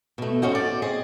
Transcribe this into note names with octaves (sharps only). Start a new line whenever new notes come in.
B2 A3
G2 C4 C#4 F#4 D#5
D5
C4 G#4 D5 D#5